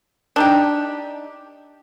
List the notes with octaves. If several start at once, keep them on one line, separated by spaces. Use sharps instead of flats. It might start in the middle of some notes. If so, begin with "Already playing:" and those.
D4 D#4 G4